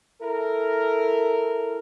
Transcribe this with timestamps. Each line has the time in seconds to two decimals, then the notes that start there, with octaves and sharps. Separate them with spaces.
0.21 E4 A4 A#4